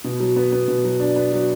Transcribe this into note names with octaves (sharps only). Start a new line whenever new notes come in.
B2
F#3
B3
B3
B2
F#3
D4
B3
F#3